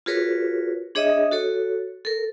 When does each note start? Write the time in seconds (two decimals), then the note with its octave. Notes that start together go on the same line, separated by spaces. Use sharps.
0.06 F4 F#4 G#4 A#4 B4 C#5
0.95 D4 G#4 C#5 D#5 E5 D#6
1.31 F#4 A4 C#5
2.05 A4 A#4